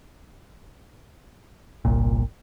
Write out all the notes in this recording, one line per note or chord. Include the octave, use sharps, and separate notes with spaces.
G1 C2 A#2